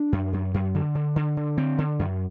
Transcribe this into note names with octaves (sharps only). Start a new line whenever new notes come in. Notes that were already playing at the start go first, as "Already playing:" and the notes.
Already playing: D4
F#2
F#2
F#2
D3
D3
D3
D3
D3 C4
D3
F#2